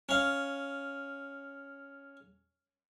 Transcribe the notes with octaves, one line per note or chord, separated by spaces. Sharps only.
C#4 F5